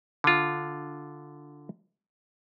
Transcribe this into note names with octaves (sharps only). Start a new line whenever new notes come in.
D3 F4